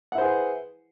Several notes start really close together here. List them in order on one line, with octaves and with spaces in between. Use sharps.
F#5 E4 C5 G#4 B4